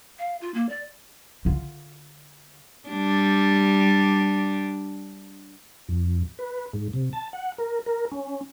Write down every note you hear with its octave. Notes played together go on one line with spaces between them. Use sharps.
F5
F4
A#3
D5
D3 F4
G3 D4
F2
B4
G#2
C3
A5
F#5
A#4
A#4
C#4